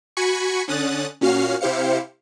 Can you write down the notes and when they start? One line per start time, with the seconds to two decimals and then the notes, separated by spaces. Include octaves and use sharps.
0.17 F#4 G#5 B5 C#6 C#7
0.68 D3 C#4 D#6 F#6 A6
1.21 A#2 C#4 F#4 F5 F6 C7
1.61 C3 E4 G4 C5 F5 C#7